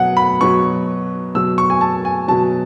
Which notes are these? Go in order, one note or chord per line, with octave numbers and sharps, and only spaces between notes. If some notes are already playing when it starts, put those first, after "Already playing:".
Already playing: B2 F#3 F#5
B5
B2 F#3 C#6
B2 F#3 E6
C#6
G#5
A5
G#5
B2 F#3 A5